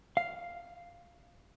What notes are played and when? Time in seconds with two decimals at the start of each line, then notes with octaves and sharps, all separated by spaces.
0.17 F5